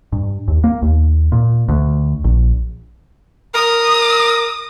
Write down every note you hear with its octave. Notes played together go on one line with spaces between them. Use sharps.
G2
D#2
A#3
D#2
A#2
D2
A#1
A#4 D#6